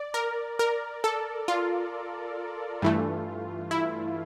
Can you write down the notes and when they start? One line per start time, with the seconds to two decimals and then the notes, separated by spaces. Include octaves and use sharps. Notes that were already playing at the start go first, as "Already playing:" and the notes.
Already playing: D5
0.14 A#4
0.59 A#4
1.04 A4
1.48 F4
2.82 G2 E3 A3
3.71 E4